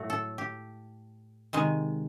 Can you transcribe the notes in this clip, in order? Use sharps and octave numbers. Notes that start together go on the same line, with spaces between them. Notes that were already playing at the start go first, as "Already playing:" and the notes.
Already playing: A2 F#3 A3 F#4
A4
G4
C3 D#3 G#3